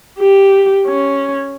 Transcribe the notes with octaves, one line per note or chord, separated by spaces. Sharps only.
G4
C#4